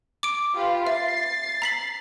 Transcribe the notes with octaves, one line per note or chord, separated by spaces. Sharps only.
D6 D7
F4 G4 B4
E5 A6 C7
A#5 B6 F#7